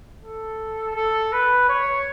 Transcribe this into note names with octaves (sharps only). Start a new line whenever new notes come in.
A4
A4
B4
C#5